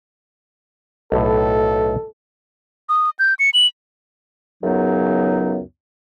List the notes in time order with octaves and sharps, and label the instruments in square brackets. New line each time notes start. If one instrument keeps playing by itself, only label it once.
[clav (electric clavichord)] B1 A2 [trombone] A4
[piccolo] D#6
G6
C#7
F#7
[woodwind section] C#2 F#2 C#3 F#3 B3 D#4